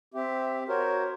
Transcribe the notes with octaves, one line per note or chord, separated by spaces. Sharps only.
C4 G4 E5
F#4 A#4 C5 C#5